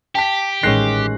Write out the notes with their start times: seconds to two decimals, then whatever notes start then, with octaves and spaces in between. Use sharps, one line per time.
0.15 G4 G5 A5 B6
0.63 A1 D#3 G#3 C#4 F#6 A#6 C7